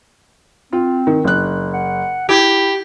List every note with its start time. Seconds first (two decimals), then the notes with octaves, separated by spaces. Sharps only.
0.73 C4 F4
1.07 D#3
1.24 F#1 F#6
1.74 F#5
2.29 E4 G4 G#6